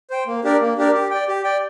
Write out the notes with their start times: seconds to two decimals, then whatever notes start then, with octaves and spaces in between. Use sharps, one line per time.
0.10 C5 G5
0.27 A#3
0.44 D4 G4 A#4 D5
0.60 A#3
0.77 D4 G4 A#4 D5
0.94 G4
1.11 D5 G5
1.28 G4
1.44 D5 G5